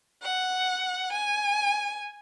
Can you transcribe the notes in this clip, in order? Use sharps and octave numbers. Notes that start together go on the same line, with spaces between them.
F#5
G#5